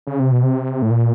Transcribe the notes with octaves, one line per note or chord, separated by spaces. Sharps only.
C#3
C3
B2
C3
A2
A#2